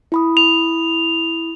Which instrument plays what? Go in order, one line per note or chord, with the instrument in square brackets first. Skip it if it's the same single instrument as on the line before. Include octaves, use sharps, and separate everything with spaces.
[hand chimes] E4 B5 D#6
[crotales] F7